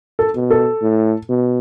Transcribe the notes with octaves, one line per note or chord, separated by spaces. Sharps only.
A4
B2
A4
A2
B2